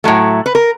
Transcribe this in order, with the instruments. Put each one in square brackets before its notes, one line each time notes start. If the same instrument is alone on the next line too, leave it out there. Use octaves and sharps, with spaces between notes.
[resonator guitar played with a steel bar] A2 F#3 A3
B4
A#4